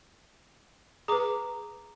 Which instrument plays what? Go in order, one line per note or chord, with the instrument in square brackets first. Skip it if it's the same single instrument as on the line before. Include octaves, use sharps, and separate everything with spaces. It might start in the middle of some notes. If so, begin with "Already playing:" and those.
[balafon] G#4 B4 [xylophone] A#5 D6